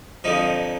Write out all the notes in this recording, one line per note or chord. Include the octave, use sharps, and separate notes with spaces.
F2 D3 F3 D#4